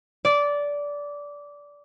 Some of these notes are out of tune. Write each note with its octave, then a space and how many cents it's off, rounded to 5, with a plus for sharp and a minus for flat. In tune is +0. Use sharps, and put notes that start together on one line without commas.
D5 -15